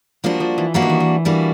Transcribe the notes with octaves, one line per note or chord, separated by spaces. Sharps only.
F3 G3 A#3 D4 F#4
F3
E3
E3 G3 A#3 D4 F#4
D#3
E3
E3
E3 G3 A#3 D4 F#4